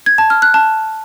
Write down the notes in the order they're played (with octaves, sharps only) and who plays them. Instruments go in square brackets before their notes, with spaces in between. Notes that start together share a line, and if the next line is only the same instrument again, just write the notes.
[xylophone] G#6
A5
F6
F#6
A5